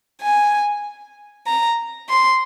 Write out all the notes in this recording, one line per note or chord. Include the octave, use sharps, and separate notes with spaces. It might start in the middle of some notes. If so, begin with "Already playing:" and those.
G#5
A#5
C6